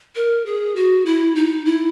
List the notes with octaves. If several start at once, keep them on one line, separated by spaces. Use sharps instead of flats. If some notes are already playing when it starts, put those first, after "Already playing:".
A#4
G#4
F#4
E4
D#4
E4